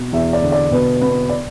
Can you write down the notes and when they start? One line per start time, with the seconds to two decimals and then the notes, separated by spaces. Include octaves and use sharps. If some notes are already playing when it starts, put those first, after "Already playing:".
Already playing: B2
0.13 E2 E5
0.33 D5
0.42 D3
0.52 D5
0.71 B2 B4
1.01 B3
1.29 D5